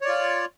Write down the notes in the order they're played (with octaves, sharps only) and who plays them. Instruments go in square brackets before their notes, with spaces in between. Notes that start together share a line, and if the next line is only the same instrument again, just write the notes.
[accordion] C#5
D5
F4